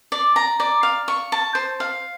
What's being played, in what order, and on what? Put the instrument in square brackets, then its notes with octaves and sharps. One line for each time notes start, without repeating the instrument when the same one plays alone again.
[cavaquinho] D5
A#5
D5
F5
C#6
A5
C5
F5